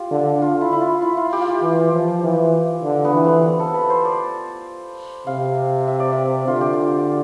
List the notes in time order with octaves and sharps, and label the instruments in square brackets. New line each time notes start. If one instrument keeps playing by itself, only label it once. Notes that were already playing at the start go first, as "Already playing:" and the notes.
Already playing: [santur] F4 G4
[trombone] D3
[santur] F4
E4
E4
F4
E4
F4
G4
F4
G4
[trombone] E3
F3
E3
D3
[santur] B3
[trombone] E3
[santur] C4
B3
A4
B4
C5
D5
[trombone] C3 [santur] F5
[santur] E5
D5
E5
[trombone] D3 [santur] F4
[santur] G4
F4